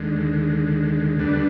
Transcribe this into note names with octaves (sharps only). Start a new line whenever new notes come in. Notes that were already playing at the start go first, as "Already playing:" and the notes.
Already playing: D#2 D3 G#3
D2 D3 G3 B3 D4